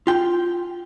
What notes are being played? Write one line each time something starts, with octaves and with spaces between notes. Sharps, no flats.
F4 G5